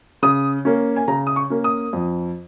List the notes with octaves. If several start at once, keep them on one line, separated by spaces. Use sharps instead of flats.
C#3 D#6
A#3 C#4
G#5
C#3 A#5
D#6
C#6
A#3 C#4
D#6
F2